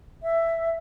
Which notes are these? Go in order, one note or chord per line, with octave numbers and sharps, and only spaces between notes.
E5